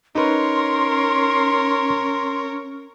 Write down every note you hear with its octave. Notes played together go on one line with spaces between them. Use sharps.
C#4 D#4 A#4 B4 C#5 C6